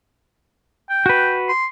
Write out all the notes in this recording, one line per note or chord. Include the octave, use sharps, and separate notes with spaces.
G5
F#4 B4
C6